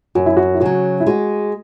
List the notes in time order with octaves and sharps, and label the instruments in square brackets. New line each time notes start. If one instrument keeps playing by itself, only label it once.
[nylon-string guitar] F#2 [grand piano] F#4
[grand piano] E4
F#4
E4
[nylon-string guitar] C#3 F#3 [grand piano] F#4
[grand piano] E4
[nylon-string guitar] G#3 [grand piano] F#4